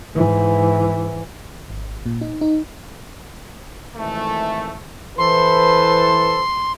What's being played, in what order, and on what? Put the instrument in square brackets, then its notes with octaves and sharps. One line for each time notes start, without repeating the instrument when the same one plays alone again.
[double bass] G#2 E3
[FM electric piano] G#1
A#2
D#4
D#4
[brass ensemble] G#1 E3 A3
[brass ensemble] E3 A4 [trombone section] B4 C5 [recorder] C6